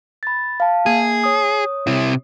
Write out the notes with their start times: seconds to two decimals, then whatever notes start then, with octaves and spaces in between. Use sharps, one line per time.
0.23 B5 A6
0.60 F5 A5
0.86 A#3 G#4
1.24 C#5 D#6
1.87 C3 E4